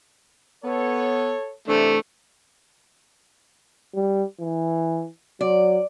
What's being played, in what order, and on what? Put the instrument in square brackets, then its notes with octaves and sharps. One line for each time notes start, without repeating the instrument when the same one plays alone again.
[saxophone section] B3 [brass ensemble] A4 C#5
[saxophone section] C3 E3 D4 [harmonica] A3
[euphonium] G3
E3
[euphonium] F#3 [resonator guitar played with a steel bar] D5